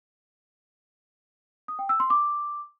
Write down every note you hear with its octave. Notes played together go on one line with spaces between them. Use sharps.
D#6
G5
E6
C6
D6